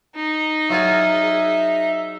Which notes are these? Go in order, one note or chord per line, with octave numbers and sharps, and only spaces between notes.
D#4
F#3 F4 G#4 E5